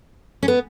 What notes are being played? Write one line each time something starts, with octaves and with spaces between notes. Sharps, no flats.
C#4
B3